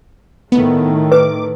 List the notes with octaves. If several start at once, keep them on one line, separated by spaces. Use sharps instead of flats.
A2 D#3 A3 B3
B4 D6